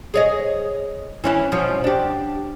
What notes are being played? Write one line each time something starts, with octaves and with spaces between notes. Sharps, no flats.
G#4 C#5 D#5
E3 C#4 E4
B2 F3 C#4
D4 G4